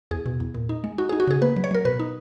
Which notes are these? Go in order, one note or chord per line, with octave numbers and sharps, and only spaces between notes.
E2 G#4
B2
E2
A#2
D#4
G#3
D#4 F#4
D#4 G#4
F#4
C#3 G#4
A#3 B4
F#3
C#5
F#3 A#4
B2 B4
D#4